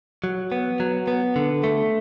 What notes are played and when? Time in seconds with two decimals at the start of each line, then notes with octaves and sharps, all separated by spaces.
0.24 F#3
0.52 B3
0.80 F#3
1.08 B3
1.36 D3
1.64 A3